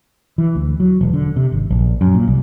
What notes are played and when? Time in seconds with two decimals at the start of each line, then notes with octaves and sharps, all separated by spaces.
0.38 E3
0.55 D2
0.80 F#3
1.01 E1
1.13 D3
1.36 C3
1.52 G#1
1.70 A#1
2.01 F#2
2.14 A#2
2.27 C2